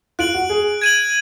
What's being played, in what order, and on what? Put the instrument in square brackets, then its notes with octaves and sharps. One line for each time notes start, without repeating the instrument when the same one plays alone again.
[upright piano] F4 [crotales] F#6 D7 F#7
[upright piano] F#4
G#4
[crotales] G#6 D#7 F#7